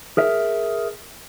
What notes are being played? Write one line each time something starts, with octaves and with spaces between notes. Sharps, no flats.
G#4 A#4 E5